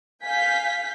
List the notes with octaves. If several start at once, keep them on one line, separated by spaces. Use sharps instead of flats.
F5 G#5 G6 B6